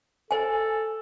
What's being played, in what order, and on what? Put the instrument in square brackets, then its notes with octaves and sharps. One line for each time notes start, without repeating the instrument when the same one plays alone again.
[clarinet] A4 [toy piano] C5 G#5